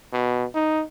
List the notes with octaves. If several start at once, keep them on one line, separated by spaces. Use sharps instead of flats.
B2
D#4